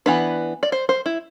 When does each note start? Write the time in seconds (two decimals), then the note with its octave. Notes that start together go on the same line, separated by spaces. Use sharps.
0.06 E3 B3 D4 B4
0.63 D5
0.72 C5
0.89 C5
1.06 E4